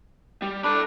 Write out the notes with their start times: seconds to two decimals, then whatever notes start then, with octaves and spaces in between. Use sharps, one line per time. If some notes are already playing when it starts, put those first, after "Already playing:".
0.42 G3
0.64 D4 A4 B5